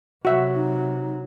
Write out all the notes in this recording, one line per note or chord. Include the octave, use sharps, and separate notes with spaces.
C3 F#3 F#4 E5 F#5
D#4